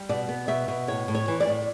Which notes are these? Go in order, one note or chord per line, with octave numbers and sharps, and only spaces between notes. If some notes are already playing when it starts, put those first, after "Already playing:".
Already playing: G3
B2 D5
B3
B2 E5
B2
A2 C#5
A2
C#5
E3
D5
A2